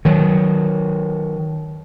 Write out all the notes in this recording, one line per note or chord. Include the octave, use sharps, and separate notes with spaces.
D#3 F#3